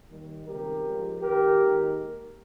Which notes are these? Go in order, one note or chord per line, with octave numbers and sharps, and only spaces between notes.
D#2 D#3 G3
C#2 C3 D#3 G3 G4 A#4
G#2 F3 G#3
D#2 D#3 G#3 G4 A#4
D#2 D#3 G#3